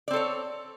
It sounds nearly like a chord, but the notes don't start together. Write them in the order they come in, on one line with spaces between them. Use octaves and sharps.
D5 C4 A4 C#5